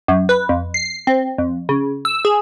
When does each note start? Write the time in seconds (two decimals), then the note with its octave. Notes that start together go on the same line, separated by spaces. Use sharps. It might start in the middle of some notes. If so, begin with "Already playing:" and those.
0.08 F#2
0.29 B4
0.49 F2
0.74 C7
1.07 C4
1.38 F2
1.69 C#3
2.05 E6
2.25 G#4